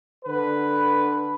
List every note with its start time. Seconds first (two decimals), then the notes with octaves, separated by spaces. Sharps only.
0.24 D3 B4